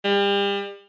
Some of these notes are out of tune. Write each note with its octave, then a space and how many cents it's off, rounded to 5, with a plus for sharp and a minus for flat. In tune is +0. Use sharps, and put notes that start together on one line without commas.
G3 +35